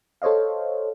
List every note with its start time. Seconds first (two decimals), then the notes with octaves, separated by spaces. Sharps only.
0.22 A4 C5 C#5 D#5 F5